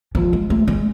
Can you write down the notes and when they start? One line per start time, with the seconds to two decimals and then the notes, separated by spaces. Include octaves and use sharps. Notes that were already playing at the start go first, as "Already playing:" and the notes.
0.15 F3
0.33 G#3
0.50 A3
0.68 G#3